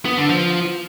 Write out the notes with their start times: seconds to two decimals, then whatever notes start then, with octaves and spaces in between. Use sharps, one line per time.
0.05 B3
0.17 D3
0.29 F3